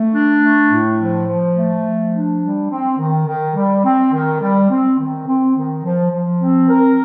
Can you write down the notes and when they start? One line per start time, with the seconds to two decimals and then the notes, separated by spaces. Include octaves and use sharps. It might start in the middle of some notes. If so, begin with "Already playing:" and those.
Already playing: A3
0.13 D4
0.41 A3
0.69 A2
0.98 F3
1.27 F3
1.55 A3
1.83 F3
2.13 D4
2.41 G3
2.70 C4
2.98 D#3
3.27 D#3
3.55 G3
3.84 C4
4.13 D#3
4.41 G3
4.70 C4
4.99 D#3
5.27 C4
5.56 D#3
5.84 F3
6.12 F3
6.41 C4
6.69 A#4